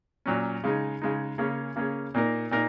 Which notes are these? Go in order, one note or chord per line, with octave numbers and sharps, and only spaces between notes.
A#2 F#3 C#4
C#3 G#3 D#4
C#3 G#3 D#4
C#3 A#3 C#4 G#4
C#3 A#3 C#4 G#4
A#2 A#3 D#4 A#4
A#2 A#3 D#4 A#4